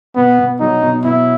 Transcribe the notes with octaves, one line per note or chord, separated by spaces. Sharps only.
B2 B3
B2
F#3 D#4
B2
B2 E4